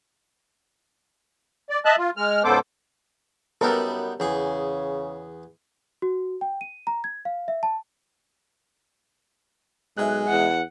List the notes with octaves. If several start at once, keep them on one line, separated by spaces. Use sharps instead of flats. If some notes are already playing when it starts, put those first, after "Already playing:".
D5
D#5 E5 A5 F#6
F4
G#3 F6
G#2 C#3 B3 A4 C5 D6
F#2 G3 B3 D#4 A4 A#4
E2 C#3 G#4
F#4
G5
D#7
A#5
G#6
F5
E5
A5
B1 G#3 E5 G#5 F#6
E2 F#5